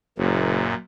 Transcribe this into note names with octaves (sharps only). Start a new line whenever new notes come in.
F#1 F#2 A#2